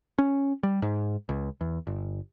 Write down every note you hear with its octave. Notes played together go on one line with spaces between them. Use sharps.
C#4
G3
G#2
C#2
E2
G1